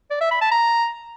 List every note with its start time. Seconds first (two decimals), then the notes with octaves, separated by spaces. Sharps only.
0.11 D5
0.21 E5
0.31 B5
0.41 A5
0.52 A#5